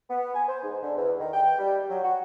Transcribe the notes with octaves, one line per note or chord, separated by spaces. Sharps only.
B3
G#5
C5
G#2
D3
E2
D#3
G5
G3
F#3
F#4